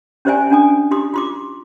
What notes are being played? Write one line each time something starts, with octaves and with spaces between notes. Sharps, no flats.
C#4 G4 C5 D5 E5 G#5
C#4 D4 G#5 D#6
E4 G4 C6 D#6
F4 C6 D6